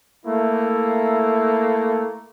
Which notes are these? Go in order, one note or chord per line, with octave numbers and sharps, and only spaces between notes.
A3 A#3 E4